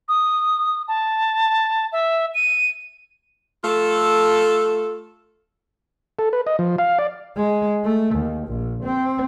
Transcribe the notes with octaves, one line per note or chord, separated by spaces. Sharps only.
D#6
A5
E5
D#7
A3 F4 A4
A4
B4
D#5
F3
F5
D5
G#3
A3
D#2
A#1
C4